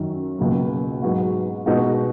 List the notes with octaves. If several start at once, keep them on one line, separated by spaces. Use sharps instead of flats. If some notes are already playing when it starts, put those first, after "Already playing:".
Already playing: F#2 D#3 F#3
C#2 B2 F#3 A#3
G#2 F#3 B3 F#4
B2 G#3 D#4 F#4